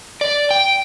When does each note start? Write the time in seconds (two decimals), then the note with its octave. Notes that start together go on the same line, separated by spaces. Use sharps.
0.21 D5
0.51 G5